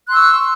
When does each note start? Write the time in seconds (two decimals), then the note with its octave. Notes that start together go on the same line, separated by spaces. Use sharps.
0.07 F#6
0.10 C6
0.13 E6
0.16 C#6